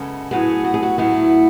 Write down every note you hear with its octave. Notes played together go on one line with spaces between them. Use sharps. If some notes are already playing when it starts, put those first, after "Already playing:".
Already playing: F#2 C#3 G#3 B3 A4
A2 F#3 B3 G#4
F#4
G#4
F#4
A2 F#3 B3 E4